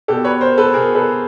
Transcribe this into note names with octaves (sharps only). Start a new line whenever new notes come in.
B2 G4 A4
B4 C#5
A#4 C5
A4 B4
B2 G#4 A#4
A4 B4